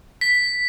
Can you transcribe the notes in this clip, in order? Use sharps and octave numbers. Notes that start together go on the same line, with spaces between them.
B6